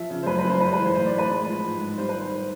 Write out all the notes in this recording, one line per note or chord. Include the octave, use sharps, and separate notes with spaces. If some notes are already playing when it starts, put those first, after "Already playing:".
Already playing: F3 E5
C#3
C5
F#2 B4
B4
F#2
C5
G#3 B4
B4
E3
C5
A2 C5
D5
A2
B4
G#3
F3
G#2
G#2
G3 C5
B4
D#3
C5